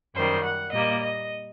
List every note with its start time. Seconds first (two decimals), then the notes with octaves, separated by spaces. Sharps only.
0.15 F#2 D#3 G3 C5
0.44 F#5
0.73 A#2 G3 A#3 D#5
1.03 D#5